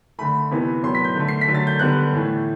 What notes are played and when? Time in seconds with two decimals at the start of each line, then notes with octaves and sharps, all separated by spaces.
0.19 D3 A3 B5
0.51 C3 E3 B3
0.83 A2 F#3 B3 C6
0.95 B6
1.05 G6
1.16 D3 A3
1.28 C7
1.41 B6
1.48 D3 F#3 A3
1.54 A6
1.67 G6
1.79 D3 G3 B3 F#6
2.13 A2 E3 A3